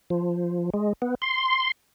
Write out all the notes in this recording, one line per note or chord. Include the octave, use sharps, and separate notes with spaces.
F3
G#3
B3
C6